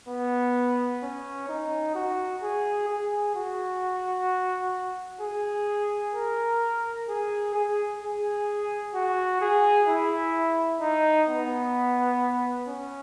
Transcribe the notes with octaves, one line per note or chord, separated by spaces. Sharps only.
B3
C#4
D#4
F#4
G#4
G#4
F#4
G#4
A#4
G#4
G#4
G#4
F#4
G#4
E4
D#4
B3
C#4